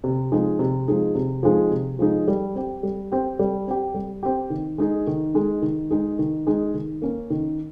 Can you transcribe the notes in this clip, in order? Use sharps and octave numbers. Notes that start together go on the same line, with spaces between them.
C3
F3 G#3 D#4 G#4
C3
F3 G#3 D#4 G#4
C3
F3 G#3 D#4 G#4
C3
F3 G#3 D#4 G#4
G3
C4 G4
G3
C4 G4
G3
C4 G4
G3
C4 G4
D#3
G#3 D#4 G#4
D#3
G#3 D#4 G#4
D#3
G#3 D#4 G#4
D#3
G#3 D#4 G#4
D#3
A#3 C#4
D#3